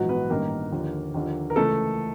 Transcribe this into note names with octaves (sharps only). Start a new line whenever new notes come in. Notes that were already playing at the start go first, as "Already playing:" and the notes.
Already playing: A#1 G#2 E3 F#3 F#4
B3 B4
A1 G2 D#3 A#3 A#4
D#2 D3 F3
D#2 D3 F3
A#4
C#2 C#3 E3 A3 A4